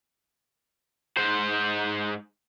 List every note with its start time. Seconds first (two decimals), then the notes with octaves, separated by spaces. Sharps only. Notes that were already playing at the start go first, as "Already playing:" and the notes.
1.17 G#2 C5